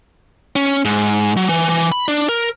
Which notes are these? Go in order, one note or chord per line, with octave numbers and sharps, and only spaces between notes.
C#4
G#2
F#3
E3
E3
B5
D4
A#4